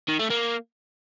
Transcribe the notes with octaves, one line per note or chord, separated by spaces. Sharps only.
D#3
A3
A#3